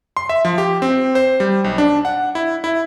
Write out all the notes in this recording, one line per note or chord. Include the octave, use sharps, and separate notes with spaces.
C6
E5
F3
G4
C4
C5
G3
B1
D4
F#5
E4
E4